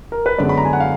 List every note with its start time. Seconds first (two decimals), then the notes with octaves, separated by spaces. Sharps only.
0.12 A#4
0.26 B4
0.38 F#2 D3 G#3 B3 D5
0.49 B5
0.58 A#5
0.65 G#5
0.73 F#5
0.80 F5